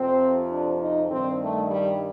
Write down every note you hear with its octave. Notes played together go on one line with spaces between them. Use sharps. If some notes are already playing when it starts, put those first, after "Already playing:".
Already playing: F2 C3 F3 C4
D4
D#4
G2 D#3 C4
A3
G3